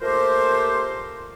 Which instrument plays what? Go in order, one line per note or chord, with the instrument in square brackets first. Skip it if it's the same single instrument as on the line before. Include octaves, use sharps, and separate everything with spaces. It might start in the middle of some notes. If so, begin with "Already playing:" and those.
[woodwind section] A#2 A3 G4 A#4 C5